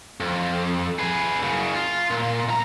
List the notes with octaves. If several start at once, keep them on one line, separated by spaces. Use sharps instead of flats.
F2
G#4 B4
F#2 C#3
F4
A#2
C2 A#5